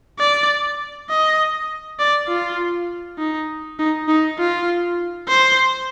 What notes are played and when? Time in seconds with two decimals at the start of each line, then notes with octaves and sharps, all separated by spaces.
0.19 D5
1.10 D#5
2.00 D5
2.28 F4
3.18 D#4
3.79 D#4
4.08 D#4
4.39 F4
5.28 C5